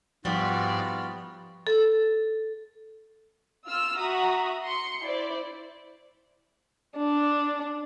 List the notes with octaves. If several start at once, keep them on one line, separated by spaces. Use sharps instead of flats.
G#2 F3 G3 B3 F4 F#4 D5
A4
F4 E6 F6
F#4 E5 A#5 D#6
C6 C#7
E4 C5 D5
D4